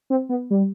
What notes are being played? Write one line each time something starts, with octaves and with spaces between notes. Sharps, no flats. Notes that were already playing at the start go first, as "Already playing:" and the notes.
C4
B3
G3